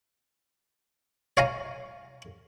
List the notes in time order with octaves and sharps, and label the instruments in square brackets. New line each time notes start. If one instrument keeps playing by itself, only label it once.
[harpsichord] C#5 F5 G#5 A#5